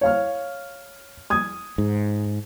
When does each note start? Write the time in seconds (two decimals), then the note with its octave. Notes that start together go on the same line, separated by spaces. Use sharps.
0.01 C#5 F5 F6
1.30 D#6 G#6
1.78 G#2